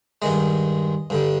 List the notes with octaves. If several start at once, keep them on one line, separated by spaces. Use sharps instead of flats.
G2 D#3 G#3 D#5
G2 D3 G3